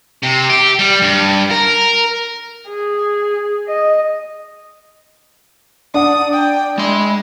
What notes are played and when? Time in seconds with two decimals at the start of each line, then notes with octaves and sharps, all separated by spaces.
0.23 C3
0.50 G4
0.79 G3
1.02 G2
1.51 A#4
2.69 G#4
3.68 D#5
5.94 D4 D5 F#5 D#6
6.33 G5
6.78 G#3 E4 C6